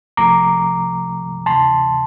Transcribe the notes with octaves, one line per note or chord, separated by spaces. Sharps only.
C2 C3 F3 A3 A#5 D6
D2 C3 E3 A5 C6